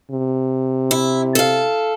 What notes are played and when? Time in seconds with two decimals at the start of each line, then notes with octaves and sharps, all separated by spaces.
0.11 C3
0.91 E4
1.35 A4 F5